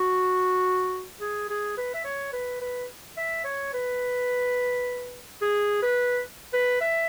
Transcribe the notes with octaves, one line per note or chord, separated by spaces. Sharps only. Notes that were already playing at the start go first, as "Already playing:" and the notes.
Already playing: F#4
G#4
G#4
B4
E5
C#5
B4
B4
E5
C#5
B4
G#4
B4
B4
E5